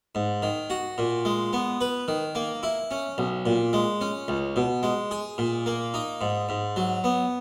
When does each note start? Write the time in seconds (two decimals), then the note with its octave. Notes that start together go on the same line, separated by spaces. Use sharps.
0.15 G#2
0.42 D#3
0.70 F#4
0.98 A#2
1.25 G#3
1.53 B3
1.81 B4
2.08 D#3
2.35 A#3
2.63 E4
2.91 C#4
3.18 B1
3.46 A#2
3.73 G#3
4.01 C#4
4.28 C#2
4.56 B2
4.83 G#3
5.11 G#4
5.38 A#2
5.66 A#3
5.94 D#4
6.21 G#2
6.49 G#2
6.76 F#3
7.04 B3